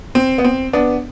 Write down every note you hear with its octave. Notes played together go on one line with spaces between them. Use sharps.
C4
B3
C4
B3 D4